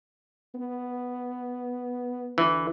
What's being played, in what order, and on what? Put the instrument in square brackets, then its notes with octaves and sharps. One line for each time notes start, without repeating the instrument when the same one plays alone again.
[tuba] B3
[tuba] D2 [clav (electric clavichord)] E3